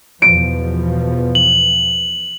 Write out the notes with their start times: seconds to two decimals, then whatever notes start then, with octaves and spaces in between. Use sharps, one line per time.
0.22 E2 B2 F3 D7
1.35 F#7